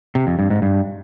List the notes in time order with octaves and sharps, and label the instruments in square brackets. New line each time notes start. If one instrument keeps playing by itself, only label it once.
[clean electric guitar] C3
F2
G2
G#2
G2